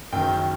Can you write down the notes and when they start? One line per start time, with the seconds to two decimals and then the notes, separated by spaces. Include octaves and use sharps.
0.13 F#1 F#2 D#3 G5